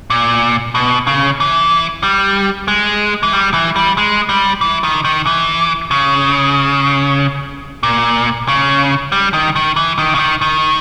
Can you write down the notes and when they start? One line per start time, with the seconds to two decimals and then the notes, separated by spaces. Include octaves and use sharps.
0.10 A#2
0.75 B2
1.07 C#3
1.40 E3
2.03 G3
2.68 G#3
3.23 E3
3.33 G3
3.54 E3
3.76 G3
3.98 G#3
4.29 G3
4.61 E3
4.84 D#3
5.05 D#3
5.26 E3
5.91 C#3
7.83 A#2
8.48 C#3
9.12 G3
9.34 D#3
9.56 D#3
9.76 E3
9.98 D#3
10.15 C#3
10.19 D#3
10.41 D#3